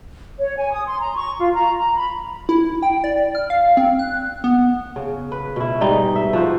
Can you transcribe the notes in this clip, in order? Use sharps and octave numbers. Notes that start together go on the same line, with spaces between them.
C#5
G#5
D#6
C6
A#5
C#6
F4
A#5
A#5
B5
E4
G5
D5
F6
F5
C4
F#6
B3
C#3
B4
B2 E4
G#2 G3 D#4
E5
F3 F#4 C5